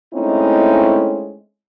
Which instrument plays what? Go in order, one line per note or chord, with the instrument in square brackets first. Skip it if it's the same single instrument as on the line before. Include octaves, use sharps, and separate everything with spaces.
[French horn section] G#3 A3 C4 C#4 D#4 E4